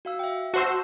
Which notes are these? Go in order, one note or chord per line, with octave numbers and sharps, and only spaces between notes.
F#4 F5 E6
E5 G5
F#4 C5 A5 E6